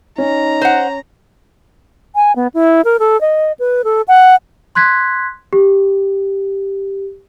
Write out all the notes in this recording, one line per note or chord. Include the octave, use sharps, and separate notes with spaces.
C#4 D#4 A#5
C5 F#5
G#5
B3
E4
A#4
A4
D#5
B4
A4
F#5
C6 F#6 G#6 B6
G4